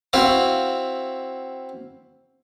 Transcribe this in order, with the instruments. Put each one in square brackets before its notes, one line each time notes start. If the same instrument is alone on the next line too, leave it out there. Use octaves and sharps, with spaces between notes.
[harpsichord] C4 E4 F#4 F5